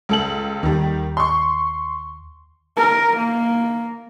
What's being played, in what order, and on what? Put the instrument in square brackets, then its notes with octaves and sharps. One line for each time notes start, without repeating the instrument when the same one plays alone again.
[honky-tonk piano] C#2 A4 F#7
[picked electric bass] D#2 [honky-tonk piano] D#3 G3
[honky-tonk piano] C6 C#6
[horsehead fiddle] A#4
A#3